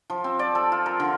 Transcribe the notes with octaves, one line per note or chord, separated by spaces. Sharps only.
F3
C4
D5
A4
F4
A#4
D3